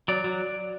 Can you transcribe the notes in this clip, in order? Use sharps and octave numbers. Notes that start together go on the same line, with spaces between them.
F#3 D5
F#3